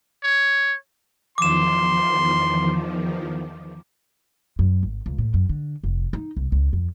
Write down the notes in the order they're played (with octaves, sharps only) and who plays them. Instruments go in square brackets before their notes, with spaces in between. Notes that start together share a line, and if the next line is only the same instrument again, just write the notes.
[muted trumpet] C#5
[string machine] E2 D#3 F3 [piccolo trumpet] C6 [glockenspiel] D6 E7
[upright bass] F#2
G#1
C#2
A2
F#2
D3
F1
D#4
C2
C#2
F2